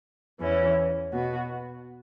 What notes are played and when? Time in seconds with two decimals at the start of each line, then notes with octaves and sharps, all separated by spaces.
0.40 E2 E3 C#4 E4
1.11 B2 B3 F#4